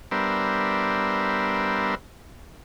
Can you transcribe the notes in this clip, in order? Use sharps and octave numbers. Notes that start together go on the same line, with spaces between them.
G3 B3 D4 A#4 C5 E5